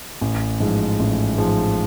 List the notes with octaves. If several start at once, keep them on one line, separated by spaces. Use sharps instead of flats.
A1
G#2 F3 G#3
A1
G#2 F3 G#3